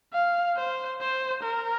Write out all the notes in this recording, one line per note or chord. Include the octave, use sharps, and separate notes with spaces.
F5
C5
C5
A#4